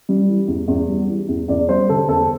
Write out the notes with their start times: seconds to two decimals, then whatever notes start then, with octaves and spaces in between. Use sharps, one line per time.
0.09 G3
0.28 E3
0.48 E2
0.68 E2
0.88 G3
1.08 E3
1.29 E2
1.48 E2 D5
1.69 G3 C5
1.89 D3 A4
2.08 E2 A4